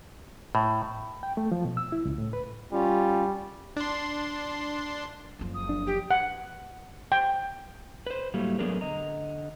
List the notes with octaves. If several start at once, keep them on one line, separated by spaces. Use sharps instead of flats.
A2
G5
A3
F3
B2
E6
E4
C#2
A2
B4
G3 C#4 F4
D4 C6
F#1 F3
D#6
D4
G4
F#5
G5
B4 C5
A2 F#3 G3 A3 A#3
F#3 A3 B3 D4 G#4 A#4
D3 D#5 A#5